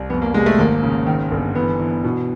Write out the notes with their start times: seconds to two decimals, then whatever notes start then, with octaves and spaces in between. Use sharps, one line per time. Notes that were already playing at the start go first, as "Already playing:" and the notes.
Already playing: C2
0.10 F2 B3
0.22 A#3
0.34 C3 G#3
0.46 A3
0.58 G#1 A#3
0.83 C#3
1.07 D#3
1.31 G1
1.55 E3 B3
1.80 E3
2.04 B2